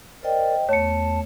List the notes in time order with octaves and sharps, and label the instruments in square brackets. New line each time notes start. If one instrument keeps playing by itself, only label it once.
[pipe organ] A#4 D5 [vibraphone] C5 D#5 G5
[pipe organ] E2 A5 [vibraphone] A3 [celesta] C#5 C#7